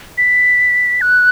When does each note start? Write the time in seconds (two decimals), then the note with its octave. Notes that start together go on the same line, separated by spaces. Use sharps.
0.18 B6
1.01 F#6